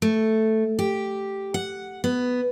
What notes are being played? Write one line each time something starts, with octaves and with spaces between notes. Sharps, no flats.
A3
G4
F#5
B3